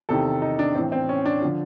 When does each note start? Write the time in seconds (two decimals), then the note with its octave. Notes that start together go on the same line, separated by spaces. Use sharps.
0.09 E2 C3 D#3 A4
0.42 D#4
0.59 D4
0.75 A2 E3 C4
0.92 C4
1.09 C#4
1.25 D4
1.42 D3 F3